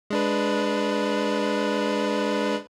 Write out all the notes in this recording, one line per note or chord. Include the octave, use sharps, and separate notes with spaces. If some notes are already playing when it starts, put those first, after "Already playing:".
G#3 D4 B4